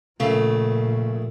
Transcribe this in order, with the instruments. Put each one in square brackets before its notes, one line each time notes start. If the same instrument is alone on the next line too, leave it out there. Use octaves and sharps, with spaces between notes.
[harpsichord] A#1 A3 [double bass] A#2 [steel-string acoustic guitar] C#3